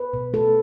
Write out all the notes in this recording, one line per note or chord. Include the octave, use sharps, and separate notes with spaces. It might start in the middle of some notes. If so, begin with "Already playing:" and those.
Already playing: B4
B2
A3 A4